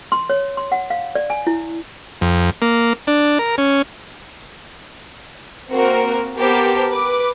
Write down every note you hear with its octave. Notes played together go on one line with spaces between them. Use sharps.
C6
C#5
C6
F#5
F5
D5
G#5
E4
F2
A#3
D4
A#4
C#4
A#3 C4 F#4 A#4
B3 G4 A#4 C5 A5
B4 D6